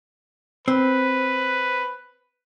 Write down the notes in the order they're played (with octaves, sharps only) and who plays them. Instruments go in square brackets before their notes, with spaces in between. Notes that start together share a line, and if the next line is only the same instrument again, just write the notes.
[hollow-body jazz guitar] C4 [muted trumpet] B4